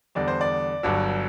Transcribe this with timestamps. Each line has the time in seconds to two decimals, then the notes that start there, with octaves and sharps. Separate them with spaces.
0.15 E2 D3 G3 D5
0.28 C5
0.41 D5
0.83 G1 G2 F#3